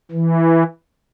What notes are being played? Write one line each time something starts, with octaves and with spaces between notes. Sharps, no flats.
E3